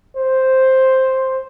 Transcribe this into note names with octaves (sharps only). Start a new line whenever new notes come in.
C5